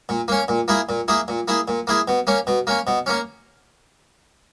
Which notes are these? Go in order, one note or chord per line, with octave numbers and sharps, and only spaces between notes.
A#2
A#3 C#4
A#2
A#3 E4 G#4
A#2
A#3 E4 G#4
A#2
A#3 E4 G#4
A#2
A#3 E4 G#4
B2
A#3 C#4
B2
A#3 C#4
B2
A#3 C#4